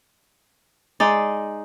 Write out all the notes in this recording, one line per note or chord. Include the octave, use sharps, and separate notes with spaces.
G#3 D#4 D5